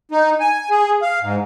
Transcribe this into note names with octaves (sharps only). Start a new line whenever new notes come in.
D#4
G#5
G#4
F5
G#2